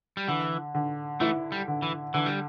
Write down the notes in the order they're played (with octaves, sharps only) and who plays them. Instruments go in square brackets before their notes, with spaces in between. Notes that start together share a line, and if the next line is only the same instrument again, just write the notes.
[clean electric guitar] G3
[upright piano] D3 [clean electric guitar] E3
[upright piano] D3
[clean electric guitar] E3 A3 [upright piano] E4
[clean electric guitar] G3
[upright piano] D3
[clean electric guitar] E3
[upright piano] D3 [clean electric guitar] E3
[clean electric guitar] G3